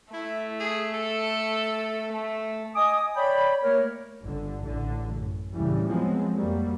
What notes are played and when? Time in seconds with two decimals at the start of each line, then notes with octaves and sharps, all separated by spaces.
0.13 A3 E4
0.60 G#4
0.94 A4
2.12 A3
2.75 D#5 G#5 D6 D#6
3.16 C#5 D5 G5 B5
3.63 A3 A#3 A#4 C#5
4.24 G1 D3
4.63 A1 D3
5.11 F#2
5.54 D2 A2 C#3 E3 G3
5.88 F3 F#3 G#3 B3 C4
6.34 F2 F#3 G3 A#3